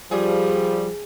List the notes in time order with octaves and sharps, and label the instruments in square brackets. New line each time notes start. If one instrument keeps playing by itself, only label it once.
[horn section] F3 G3 [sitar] G#4